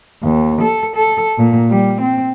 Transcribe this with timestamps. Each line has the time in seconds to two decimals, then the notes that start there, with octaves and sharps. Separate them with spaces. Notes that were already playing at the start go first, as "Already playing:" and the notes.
0.20 D#2
0.60 A4
0.94 A4
1.37 A#2
1.70 G3
2.00 C4